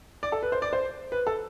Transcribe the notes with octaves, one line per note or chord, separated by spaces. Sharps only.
D5
A4
B4
C5
D5
C5
B4
A4